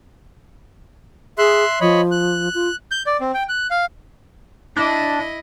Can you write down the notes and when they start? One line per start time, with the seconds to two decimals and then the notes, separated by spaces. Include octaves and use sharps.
1.38 G#4 E5 C6 F#6
1.81 F3 C#5 D#5 B5
2.11 F#6
2.54 F4
2.91 G6
3.06 D5
3.20 C4
3.34 G5
3.49 F#6
3.71 F5
4.76 D4 E4 D#5